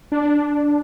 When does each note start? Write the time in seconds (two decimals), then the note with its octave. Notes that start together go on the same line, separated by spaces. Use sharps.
0.12 D4